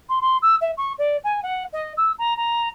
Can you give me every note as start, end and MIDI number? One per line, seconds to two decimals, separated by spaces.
0.09 0.19 84
0.21 0.37 84
0.42 0.55 88
0.61 0.71 76
0.77 0.93 85
0.98 1.17 74
1.24 1.40 80
1.43 1.63 78
1.73 1.93 75
1.97 2.12 88
2.18 2.34 82
2.37 2.68 82